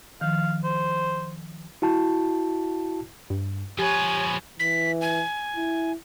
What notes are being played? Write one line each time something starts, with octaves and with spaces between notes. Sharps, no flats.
D#3 F3 F5
C5
E4 F#4 A5
G2
F3 G4 B4 C#5 G#5
E3 B6
G#5
E4